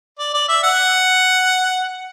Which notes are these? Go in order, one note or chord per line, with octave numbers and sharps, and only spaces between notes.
D5
D5
E5
F#5